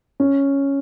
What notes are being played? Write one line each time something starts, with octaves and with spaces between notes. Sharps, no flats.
C#4